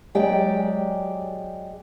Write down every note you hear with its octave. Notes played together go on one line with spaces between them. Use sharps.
F#3 G#3 G4 D5 G5